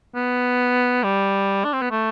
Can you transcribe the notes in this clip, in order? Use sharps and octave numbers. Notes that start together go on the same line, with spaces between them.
B3
G3
D4
C4
B3
A3